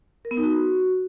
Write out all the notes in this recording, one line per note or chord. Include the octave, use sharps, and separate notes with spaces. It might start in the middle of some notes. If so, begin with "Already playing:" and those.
A#4
B3
D#4
F#4